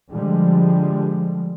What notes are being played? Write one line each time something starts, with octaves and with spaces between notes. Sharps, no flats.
D3 F3 G3 G#3